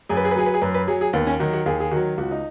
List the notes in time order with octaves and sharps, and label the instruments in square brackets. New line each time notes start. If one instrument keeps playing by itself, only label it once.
[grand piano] F#2 G#4
B4
G#4
B4
F#3 G#4
B4
G#4
F#2 B4
B4
F#3 G#4
G#4
D#2 B3
C#4
D#3 F#3 F#4
F#4
D#2 G#4
G#4
D#3 F#4
F#3
C#2 F#4
D#4